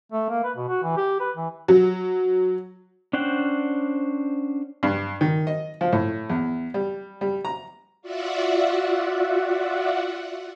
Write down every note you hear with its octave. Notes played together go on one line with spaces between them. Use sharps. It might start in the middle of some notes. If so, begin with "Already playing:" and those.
A3
A#3
B4
B2
F#4
E3
G4
B4
E3
F#3
C#4 D4 C5 F#5 G5
G2
D#3
D#5
F3
A2
E2
G3
G3
A#5
F4 F#4 D5 E5 F#5